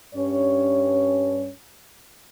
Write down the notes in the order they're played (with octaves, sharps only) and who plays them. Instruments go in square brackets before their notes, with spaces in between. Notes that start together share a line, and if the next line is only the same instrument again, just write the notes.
[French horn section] G2 C#4 C#5